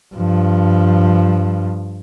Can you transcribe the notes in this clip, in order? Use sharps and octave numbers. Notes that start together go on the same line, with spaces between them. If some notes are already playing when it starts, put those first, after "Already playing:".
G2 F3